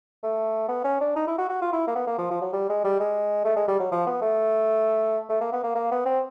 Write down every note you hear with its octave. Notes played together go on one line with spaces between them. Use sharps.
A3
B3
C#4
D4
D#4
E4
F#4
F#4
F4
E4
A#3
B3
A#3
F3
F3
F#3
G3
G#3
G3
G#3
A3
G#3
G3
F#3
F3
B3
A3
A3
A#3
B3
A#3
A#3
B3
C4